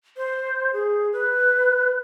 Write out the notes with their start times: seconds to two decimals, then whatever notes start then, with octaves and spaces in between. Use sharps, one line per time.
0.17 C5
0.73 G#4
1.13 B4